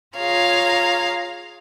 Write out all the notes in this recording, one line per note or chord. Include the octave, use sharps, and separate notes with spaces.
F4 G#4 C#5 F5 A#5